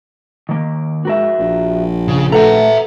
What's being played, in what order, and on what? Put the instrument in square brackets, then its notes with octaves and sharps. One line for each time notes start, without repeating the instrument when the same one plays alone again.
[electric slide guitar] D#3 A#3
[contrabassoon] G#2 [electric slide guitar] F#4 A#4 E5
[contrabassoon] A#1
[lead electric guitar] C#3
[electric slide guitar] A3 [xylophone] A4 B4 F#5 [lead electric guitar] E5 A#5